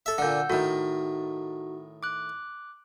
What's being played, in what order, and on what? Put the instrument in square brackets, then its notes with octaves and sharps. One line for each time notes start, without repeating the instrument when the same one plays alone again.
[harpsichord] A4 E5
[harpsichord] A#2 D3 [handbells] F#5 E6 G6
[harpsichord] A2 D#3 [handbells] D#4 F#4
[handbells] D6 F#6